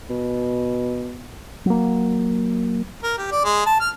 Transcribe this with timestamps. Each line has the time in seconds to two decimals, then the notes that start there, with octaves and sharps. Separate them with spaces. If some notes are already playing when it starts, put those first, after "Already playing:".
0.10 B2
1.66 F#3 A#3
3.03 A#4
3.18 G4
3.32 D5
3.45 G#3
3.66 A5
3.80 F6